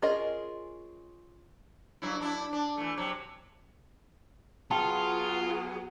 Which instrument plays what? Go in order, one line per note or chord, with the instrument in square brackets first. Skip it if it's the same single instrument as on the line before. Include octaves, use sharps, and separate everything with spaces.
[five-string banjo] C#4 F4 G#4 A#4 D#5
[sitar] G2 F#3 E4
F#2 D4 E4
D4
E3 A3
C3 F#3
[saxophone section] F#3 B3 G#4 [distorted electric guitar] F4 [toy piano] G5 A5